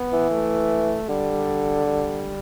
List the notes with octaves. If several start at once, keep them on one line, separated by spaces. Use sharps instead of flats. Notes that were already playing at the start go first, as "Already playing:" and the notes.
Already playing: B3
E3
A3
D3 G3
G3